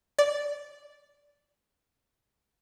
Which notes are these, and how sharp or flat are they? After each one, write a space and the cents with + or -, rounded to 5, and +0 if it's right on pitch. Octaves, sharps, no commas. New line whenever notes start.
D5 -10